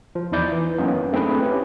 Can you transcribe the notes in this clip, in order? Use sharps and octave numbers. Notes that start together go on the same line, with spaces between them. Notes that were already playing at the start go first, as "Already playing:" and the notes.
F3
E2 F3 D#4 E4 D5 G6
E3
F#2 A#3 B3 C#4 D#4
A3 C4 D4 E4 G#4 B4
C#4 E4 G4